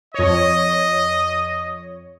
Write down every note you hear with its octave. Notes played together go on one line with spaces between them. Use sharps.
F2 C#5 D#5